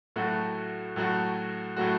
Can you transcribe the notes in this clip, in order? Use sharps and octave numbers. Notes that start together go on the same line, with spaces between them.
A2 F#3 A3 F#4
A2 F#3 A3 F#4
A2 F#3 A3 F#4